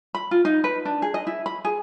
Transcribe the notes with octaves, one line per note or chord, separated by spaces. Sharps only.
B5
F4
D#4
B4
D4
G#4
D#5
E4
B5
G#4